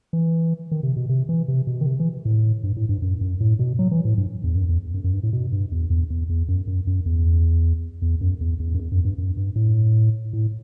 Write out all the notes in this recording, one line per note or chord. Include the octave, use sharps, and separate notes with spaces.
E3
D#3
C3
B2
C3
E3
C3
B2
D#3
C3
E3
A2
G2
A2
G2
F#2
F#2
A2
B2
F#3
E3
A2
G2
E2
F#2
E2
F#2
F#2
G2
A2
B2
G2
E2
E2
E2
E2
F#2
F#2
F#2
E2
E2
F#2
E2
E2
F#2
E2
F#2
G2
F#2
G2
A2
A2